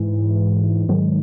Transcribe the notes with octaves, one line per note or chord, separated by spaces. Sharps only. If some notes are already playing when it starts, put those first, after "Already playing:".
Already playing: G#2 E3
G#2 D#3 F#3